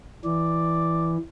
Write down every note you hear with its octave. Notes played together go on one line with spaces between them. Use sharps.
E3 D5